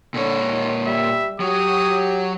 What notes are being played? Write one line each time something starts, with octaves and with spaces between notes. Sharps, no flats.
A#2 D3 C#5
D#2
G3 E5
F#3 F#4 G4 D#6